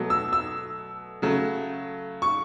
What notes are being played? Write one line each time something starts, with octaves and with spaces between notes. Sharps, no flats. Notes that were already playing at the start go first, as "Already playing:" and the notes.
Already playing: B2 F#3 A3
E6
E6
C#3 F#3 A3
C#6